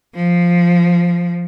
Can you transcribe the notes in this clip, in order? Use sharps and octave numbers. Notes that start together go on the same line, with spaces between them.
F3